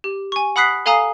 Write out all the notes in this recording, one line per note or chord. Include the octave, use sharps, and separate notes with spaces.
G4
G#5 C#6
F#5 B5 D#6 F#6 B6 C7
A4 F5 G#5 A#5 D#6 C7